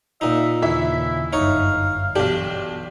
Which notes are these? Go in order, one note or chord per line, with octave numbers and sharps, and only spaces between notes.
A#2 D#4 E5
D#2 C#3 E3 E4 E5
G1 F#2 D#4 C#5 F5
B1 E3 D4 G4